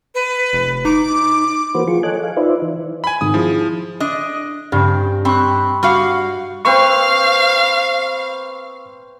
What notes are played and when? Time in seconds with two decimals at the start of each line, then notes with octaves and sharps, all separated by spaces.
0.15 B4
0.53 F1
0.85 D#4 D6
1.75 E3 A#3 F#4 B4 C5
1.88 F3 F4 G#4 C#6
2.03 A4 C#5 D#5 G#5 D6 F#6
2.23 F5
2.37 D#4 F4 B4 C5 D5 E5
2.62 E3
3.04 G#5 B5
3.21 G#1 D#6
3.34 F3 E4 G#4
4.00 D4 D#5
4.72 G2 C#3 C4
5.25 C4 B5 C#6 F#6
5.83 G3 F#4 F5
6.65 C4 B4 F5 B5 C#6